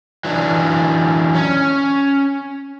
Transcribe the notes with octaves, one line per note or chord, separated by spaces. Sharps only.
E3 F#3 D4
C#4